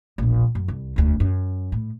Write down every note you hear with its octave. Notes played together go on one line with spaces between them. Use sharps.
E1 A#1
F#2
C2
E1 D2
F#2
A2